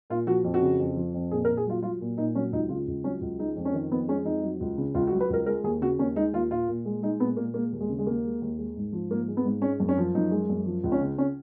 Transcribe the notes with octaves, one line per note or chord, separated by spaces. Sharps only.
A#2 F4
F3 F#4
F2
F#4
C#3
F2
F3
F2
A#2 G#4
A#4
A#2
G#4
F#3 F4
F#3 F4
A#2
A#2 D#4
F#3 C#4
C#2 D#4
C#3 F4
C#2
F#3 C#4
C#2
G#3 D#4
F2
C#4
D#3
F2 B3
G#3 C#4
F2 D#4
F#3
C#2
C#3
C#2 F4
F#4
F#3
B4
C#2 A#4
G#3 A#4
D#2 G#4
C#3 F#4
D#2 C#4
G#3 D#4
D#2 F4
A#2 F4
A#2
G#3
G#3 D#4
A#2 B3
A#2 A#3
G#3 A#3
D#2
G#3
C#3
G#3
D#2 A#3
G#3
D#2
G#3
G#2
F3
G#2 A#3
G#3
B3
G#2
G#3 C#4
F#2
C#4
F3
F#2 D#4
G#3
F#2
F3
C#2
C#4
C#3
C#4